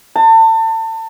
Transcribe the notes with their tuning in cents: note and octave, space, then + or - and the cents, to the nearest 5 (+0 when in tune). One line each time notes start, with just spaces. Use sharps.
A5 +30